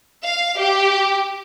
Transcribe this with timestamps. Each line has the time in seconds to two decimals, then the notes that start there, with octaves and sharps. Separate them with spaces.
0.25 F5
0.59 G4